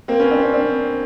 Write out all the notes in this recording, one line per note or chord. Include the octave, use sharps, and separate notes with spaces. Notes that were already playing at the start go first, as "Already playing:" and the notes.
A#3 C4
B3 C#4
C4 D4
C4 D4
C4 D4